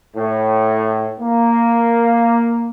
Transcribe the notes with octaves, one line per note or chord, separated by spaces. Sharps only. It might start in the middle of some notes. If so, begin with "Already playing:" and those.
A2
A#3